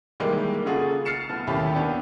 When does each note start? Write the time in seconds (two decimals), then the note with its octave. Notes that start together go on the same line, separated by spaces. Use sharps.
0.20 D#3 E3 G3 G#3 A#3
0.65 C#3 A#3 F4 F#4 G#4 A4
1.05 F6 A6 C7 C#7 E7
1.29 D1 B3 A5
1.47 D#2 A2 D#3 C#4 G4 B5
1.75 A#3 B3 D4 G4